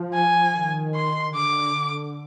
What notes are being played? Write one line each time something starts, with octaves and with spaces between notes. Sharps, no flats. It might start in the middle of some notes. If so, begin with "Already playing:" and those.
Already playing: F3
G#5
D#3
C6
D3 D6